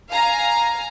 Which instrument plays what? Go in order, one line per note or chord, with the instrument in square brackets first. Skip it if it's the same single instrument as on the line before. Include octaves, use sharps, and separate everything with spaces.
[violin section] F5 G#5 A#5